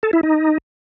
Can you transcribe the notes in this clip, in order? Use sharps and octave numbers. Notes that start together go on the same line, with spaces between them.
A4
E4
D#4